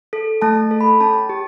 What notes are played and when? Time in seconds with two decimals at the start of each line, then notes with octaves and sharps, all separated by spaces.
0.13 A4
0.42 A3 A5
0.71 A4
0.81 B5
1.00 C#4 A5
1.29 G4